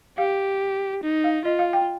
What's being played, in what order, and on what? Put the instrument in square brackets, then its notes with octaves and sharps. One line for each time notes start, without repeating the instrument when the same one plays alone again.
[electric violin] G4 [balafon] F5
[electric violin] D#4
[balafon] F5
[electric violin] F4 [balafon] D#5
[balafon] F5
G5